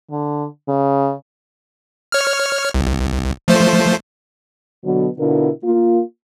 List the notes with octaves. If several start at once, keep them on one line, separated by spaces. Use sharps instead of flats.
D3
C#3
C#5 F6
C2
F3 A3 C5
B2 D3 F#3
B2 D3 D4 E4 F4 A#4
A#3 F4